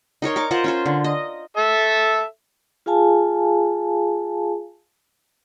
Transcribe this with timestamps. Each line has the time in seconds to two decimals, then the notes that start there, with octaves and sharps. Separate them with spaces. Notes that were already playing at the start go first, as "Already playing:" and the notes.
0.22 D#4 A#4 C#5 C6
0.36 A#4 C#6 D6
0.51 F4 A#4 C5 F#5
0.64 C#4 F4 C5
0.86 D3
1.04 D#5
1.57 A4 E5
2.86 F4 G#4 F5 G#5 A5